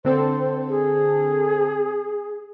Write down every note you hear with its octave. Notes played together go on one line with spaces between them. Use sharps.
D3 C4 A4 C5
G#4